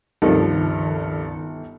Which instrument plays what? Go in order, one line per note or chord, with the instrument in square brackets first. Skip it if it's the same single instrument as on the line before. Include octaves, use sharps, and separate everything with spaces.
[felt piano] G1 [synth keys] C#2 A4 C#7 [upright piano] G2 C3 F3 [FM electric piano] D#3